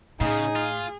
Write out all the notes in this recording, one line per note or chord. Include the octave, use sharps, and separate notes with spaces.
A2 C#3 D#4 G#4
F4